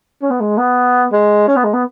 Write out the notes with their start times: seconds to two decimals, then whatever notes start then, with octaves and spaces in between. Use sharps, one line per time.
0.22 C#4
0.31 B3
0.40 G#3
0.58 B3
1.12 G#3
1.48 C#4
1.56 B3
1.64 G#3
1.74 B3